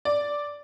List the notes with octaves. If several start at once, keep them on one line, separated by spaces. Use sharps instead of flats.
D5